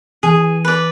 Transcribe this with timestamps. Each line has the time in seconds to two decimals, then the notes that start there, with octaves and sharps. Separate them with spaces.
0.23 E3 G#4
0.65 B4 D5